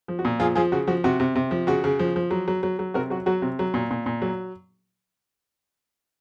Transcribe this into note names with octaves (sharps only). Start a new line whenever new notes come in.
F3
F#4
A#2
F3 F4 G#4
F3 F4 G#4
C#3 F#4
F3 F#4
C3 F#4
C3
C3
F3
C#3 F#4
C#3
F3
F3
F#3
F#3
F#3
F#3
C3 F#4 A#4
F#3 F#4
F#3 F#4
C3
F#3
A#2
A#2
A#2
F#3